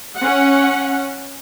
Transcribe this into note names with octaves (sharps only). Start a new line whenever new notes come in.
C#4 F#5